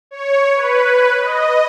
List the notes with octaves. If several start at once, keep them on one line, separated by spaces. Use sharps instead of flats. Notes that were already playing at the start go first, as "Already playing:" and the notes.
C#5
B4
D#5